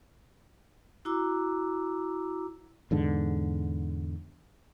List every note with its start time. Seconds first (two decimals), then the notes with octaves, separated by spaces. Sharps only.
1.05 E4 F#4 A#5 D6 E6
2.91 E2 G#2 D3